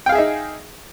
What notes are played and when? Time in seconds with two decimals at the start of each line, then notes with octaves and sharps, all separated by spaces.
0.06 G5
0.09 F5
0.12 G#4
0.15 E5
0.18 D#4